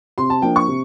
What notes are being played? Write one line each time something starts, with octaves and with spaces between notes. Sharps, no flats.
C3 C6
A5
F3 A#3 D4 G5
C#6
C3